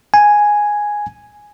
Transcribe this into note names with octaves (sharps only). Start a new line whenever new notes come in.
G#5